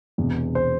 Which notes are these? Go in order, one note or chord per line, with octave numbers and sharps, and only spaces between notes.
E1 E2 C3
C5